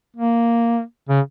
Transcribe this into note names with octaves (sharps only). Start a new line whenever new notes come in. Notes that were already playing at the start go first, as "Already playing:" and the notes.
A#3
C#3